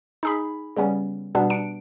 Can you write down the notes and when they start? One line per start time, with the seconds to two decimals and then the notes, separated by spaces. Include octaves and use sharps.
0.23 D#4 G#4 B5
0.77 C#3 G3 B3 C#4
1.35 B2 G3 B3 D4
1.50 D4 C#7 D7